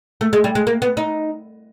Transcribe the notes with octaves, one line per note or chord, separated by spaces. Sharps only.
A3
G#3
G3
G#3
A#3
B3
D#4